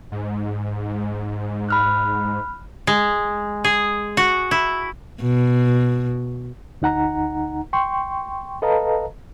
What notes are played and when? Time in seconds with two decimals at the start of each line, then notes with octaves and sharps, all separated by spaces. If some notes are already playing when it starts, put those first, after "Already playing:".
0.12 G#2
1.69 B5 F6 F#6
2.87 G#3
3.64 G#4
4.17 F#4
4.51 E4
5.22 B2
6.82 D2 D#4 F#5 A#5
7.73 G5 C6 C#6
8.62 A4 B4 D#5 F5 A5 A#5